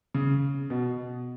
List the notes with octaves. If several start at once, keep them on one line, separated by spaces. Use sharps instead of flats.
C#3
B2